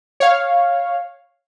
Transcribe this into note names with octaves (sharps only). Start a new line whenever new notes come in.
C#5 F5